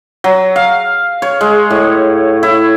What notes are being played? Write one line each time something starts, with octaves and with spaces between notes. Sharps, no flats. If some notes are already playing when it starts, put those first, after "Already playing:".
F#3
F5
C#5
G#3
A2
E4